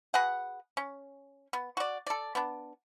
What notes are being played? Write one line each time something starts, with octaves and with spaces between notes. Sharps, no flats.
F#4 G#4 B4 F#5
C#4
B3
F#4 D5
A4 D5
B3 D4